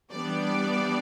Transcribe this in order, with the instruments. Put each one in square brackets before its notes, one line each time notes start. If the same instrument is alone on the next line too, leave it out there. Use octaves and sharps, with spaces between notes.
[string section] E3 G3 B3 D4 D5